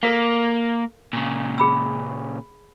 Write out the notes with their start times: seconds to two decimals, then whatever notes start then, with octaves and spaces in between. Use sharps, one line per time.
0.03 A#3 A4 A#4 F5
1.13 A#2 C#3
1.58 G#4 B5 E6